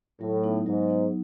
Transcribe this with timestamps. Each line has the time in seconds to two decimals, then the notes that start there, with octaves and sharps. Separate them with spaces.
0.21 A2 F#3
0.43 B3 D#4
0.66 G#2 F#3
0.88 B3 D#4